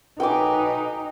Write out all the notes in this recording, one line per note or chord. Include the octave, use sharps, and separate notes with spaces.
F#3 D#4 A4 B4 G5 G#5 D6